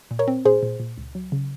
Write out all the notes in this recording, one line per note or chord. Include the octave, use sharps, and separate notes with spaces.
A#2
A#4 C#5
C4
A#2 G#4 C5
A#2
A#2
C#2
F#3
C#3